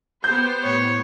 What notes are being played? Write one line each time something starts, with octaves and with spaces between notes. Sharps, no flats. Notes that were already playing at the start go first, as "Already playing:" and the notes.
B3 G4 C5 G6
A2 C#5